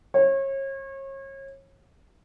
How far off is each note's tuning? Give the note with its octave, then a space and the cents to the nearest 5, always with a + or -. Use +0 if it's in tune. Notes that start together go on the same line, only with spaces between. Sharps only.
C#5 -35